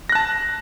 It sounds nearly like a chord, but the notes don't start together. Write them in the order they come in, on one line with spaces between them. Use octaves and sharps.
A#6 F#6 A5